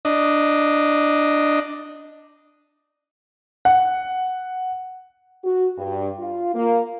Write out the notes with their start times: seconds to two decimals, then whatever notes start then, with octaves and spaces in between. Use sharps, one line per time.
0.05 D4 D#5
3.65 F#5
5.44 F#4
5.77 G2
6.19 F4
6.54 A#3